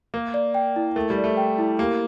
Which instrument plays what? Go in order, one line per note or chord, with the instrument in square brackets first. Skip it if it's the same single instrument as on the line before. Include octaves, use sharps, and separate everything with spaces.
[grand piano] A#3 [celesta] A#4
[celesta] D5
G5
E4
[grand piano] A3 [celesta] A#4
[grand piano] G3
[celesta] D5
[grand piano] A3
[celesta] G5
E4
[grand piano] A#3 [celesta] G4